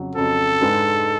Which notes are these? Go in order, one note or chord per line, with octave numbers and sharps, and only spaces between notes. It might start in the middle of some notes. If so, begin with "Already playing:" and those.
Already playing: F2 C#3 F#3
F2 C#3 F#3 A4
G#2 G#3 D4 G#4 B4